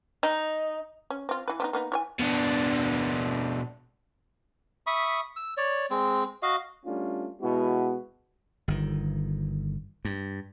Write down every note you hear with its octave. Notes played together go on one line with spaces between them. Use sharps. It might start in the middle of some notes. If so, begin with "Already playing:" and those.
D#4
C#4
C4 F4
E3 B4
F3 B3 D#4
A#3 B3 D#4
E4 C#5 G#5
B2 D4
E5 B5 C#6 D#6
E6
C#5 D5
G#3 C4
F#4 D#5 F5
G3 A3 C#4 D4 F4
B2 G#3 B3 E4 F#4
G1 D#3
G2